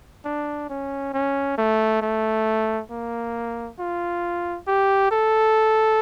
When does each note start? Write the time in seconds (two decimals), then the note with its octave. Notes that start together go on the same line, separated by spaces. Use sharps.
0.25 D4
0.69 C#4
1.14 C#4
1.58 A3
2.02 A3
2.91 A#3
3.79 F4
4.67 G4
5.11 A4